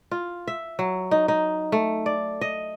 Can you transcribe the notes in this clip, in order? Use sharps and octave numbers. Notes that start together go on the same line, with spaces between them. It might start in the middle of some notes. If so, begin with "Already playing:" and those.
F4
E5
F#3
D#4
D#4
A3
D5
D#5